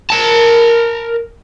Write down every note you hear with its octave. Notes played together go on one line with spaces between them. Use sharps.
A#4 A5